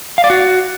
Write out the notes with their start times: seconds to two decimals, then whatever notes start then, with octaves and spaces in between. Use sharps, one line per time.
0.18 F5
0.24 D5
0.30 F#4